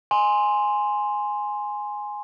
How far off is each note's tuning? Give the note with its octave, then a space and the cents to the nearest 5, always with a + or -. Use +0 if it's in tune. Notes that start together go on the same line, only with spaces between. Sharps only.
G#5 +0 C6 +0